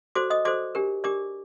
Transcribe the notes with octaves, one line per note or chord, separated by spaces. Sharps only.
F#4 A4 C5 D5 D6
D#5 D#6
F#4 A4 C5 D5 D6
D4 G4 A#4
D4 G4 A#4 D5 D6